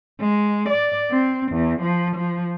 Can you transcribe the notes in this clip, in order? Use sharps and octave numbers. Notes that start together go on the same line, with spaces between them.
G#3
D5
C4
E2
F3
F3